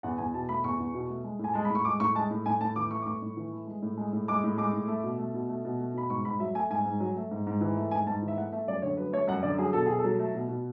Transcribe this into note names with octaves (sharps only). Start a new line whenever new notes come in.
E2 F#5
E2 G#5
B2 A5
A3 B5
E2 C#6
E2
B2
A3
G#3
A2
G#5
G#3 A5
B5
A2
C#6
G#3 D6
A2 C#6
G#3 A5
A2
A2 G#5
A2 A5
E3 D6
A3 C#6
D6
A2 C#6
A2
E3
A3
G#3
A2
G#3
A2
G#3 D6
A2
G#3 D6
A2
A3
B2
A3
B2
A3
B2
A3
B2 B5
G#2 C#6
G#2 B5
F#3 E5
A3 G#5
G#2 G#5
G#2
F#3
A3
G#2
G#2
E3
A3
G#2 G#5
G#2 A5
E3
E5
A3 F#5
A3 E5
F#2 D5
D3 C#5
F#3 B4
A3 C#5
F#2 F#5
D3 D5
F#3 G#4
B2 A4
B2 G#4
A4
F#3
A3
B2
B2